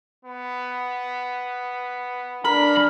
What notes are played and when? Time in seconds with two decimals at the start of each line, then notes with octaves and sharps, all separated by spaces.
0.25 B3
2.45 F#2 D4 A#4 B5